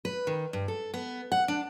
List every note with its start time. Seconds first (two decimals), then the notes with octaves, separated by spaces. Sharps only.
0.05 B4
0.27 D#3
0.53 G2
0.68 A4
0.94 B3
1.32 F#5
1.48 D4